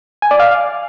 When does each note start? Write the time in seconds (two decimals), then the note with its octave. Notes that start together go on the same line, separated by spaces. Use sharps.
0.22 G#5
0.31 D5
0.40 F5